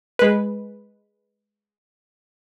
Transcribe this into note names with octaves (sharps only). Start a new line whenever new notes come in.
G#3 B4